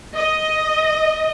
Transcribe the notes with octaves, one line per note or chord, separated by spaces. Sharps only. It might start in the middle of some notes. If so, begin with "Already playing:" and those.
D#5